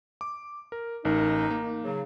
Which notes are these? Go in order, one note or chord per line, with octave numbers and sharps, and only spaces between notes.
D6
A#4
A1 D#4 A#4
A#3
C#3 F#3